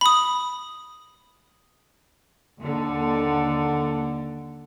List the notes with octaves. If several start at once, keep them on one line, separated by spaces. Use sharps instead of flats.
B5 D#6
D#2 D3